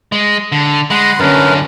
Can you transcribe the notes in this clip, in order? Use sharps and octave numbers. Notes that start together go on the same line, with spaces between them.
G#3
D3
G#3 F#5 B5 C6
F#2 D3 C#4 A#4 B4